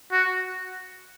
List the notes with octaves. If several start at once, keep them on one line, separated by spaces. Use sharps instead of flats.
F#4